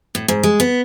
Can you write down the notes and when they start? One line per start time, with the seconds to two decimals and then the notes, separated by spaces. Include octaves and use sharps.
0.15 A2
0.28 G#2
0.43 G#3
0.60 B3